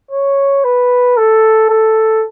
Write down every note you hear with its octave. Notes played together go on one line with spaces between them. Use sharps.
C#5
B4
A4
A4